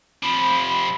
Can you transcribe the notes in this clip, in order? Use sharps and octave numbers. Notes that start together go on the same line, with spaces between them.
C3 F3 B5